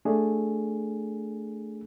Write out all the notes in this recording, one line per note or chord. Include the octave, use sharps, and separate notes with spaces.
A3 D4 G#4